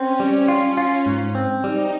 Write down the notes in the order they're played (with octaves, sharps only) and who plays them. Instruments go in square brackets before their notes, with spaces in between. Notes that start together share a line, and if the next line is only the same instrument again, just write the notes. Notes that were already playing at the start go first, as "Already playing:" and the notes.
Already playing: [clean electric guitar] C4 [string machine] C#4
[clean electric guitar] G3
F4
F4
G#2
C4
[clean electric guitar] G3 [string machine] D#4